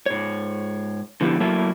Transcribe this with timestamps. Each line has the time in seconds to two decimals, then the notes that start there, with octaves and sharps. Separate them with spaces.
0.06 G#2 C#5
1.21 D3 F3 B3 E4 G4
1.40 F#3 A3 A#3 E4 C#5 A5